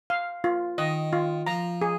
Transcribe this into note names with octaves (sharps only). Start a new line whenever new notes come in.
F5
F4
D#3 D#5
F4
F3 A#5
G#4